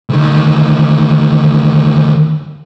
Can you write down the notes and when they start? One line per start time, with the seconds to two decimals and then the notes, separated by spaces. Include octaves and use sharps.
0.10 D2 D#3